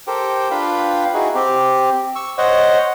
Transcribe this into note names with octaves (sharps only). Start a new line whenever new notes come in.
G4 A4 A#4 C5 G5
D4 F4 B4 F5 G5 B5
D#4 E4 F#4 G#4
C4 G4
C#6 E6
C5 C#5 D#5 F#5